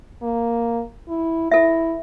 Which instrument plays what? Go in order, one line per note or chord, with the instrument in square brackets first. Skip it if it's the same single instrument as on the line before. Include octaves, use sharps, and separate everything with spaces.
[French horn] A#3
E4
[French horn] E4 [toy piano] A4 E5